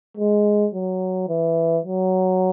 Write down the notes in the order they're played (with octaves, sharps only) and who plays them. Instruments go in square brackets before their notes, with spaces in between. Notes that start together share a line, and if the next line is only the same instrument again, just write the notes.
[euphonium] G#3
F#3
E3
F#3